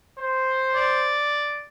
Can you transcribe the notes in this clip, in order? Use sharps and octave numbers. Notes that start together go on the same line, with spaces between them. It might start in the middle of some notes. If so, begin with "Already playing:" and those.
C5
D5